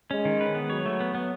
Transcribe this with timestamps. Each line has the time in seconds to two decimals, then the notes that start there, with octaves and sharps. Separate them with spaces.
0.11 G#3 C#4
0.25 D#3
0.41 B4
0.55 B3
0.70 F#3 C#5
0.86 A3
1.00 B3
1.15 B3